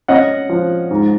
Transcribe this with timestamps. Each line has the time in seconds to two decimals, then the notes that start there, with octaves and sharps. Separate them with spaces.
0.08 C#4 D#5 F#5
0.49 F3
0.91 G#2